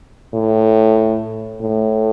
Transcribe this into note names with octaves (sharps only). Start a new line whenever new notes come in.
A2
A2